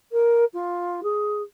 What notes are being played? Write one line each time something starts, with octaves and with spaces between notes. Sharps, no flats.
A#4
F4
G#4